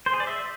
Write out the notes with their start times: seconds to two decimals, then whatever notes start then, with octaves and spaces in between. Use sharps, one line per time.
0.06 C5
0.13 G#4
0.20 D5
0.27 E5